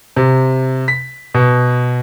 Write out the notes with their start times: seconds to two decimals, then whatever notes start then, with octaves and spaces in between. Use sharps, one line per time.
0.16 C3
0.88 B6
1.34 B2